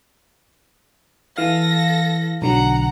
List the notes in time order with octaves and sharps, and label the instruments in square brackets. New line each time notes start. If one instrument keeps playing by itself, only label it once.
[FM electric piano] E3 F5 [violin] A4 A#6
[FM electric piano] B1 D3 F#3 [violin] F#5 A#5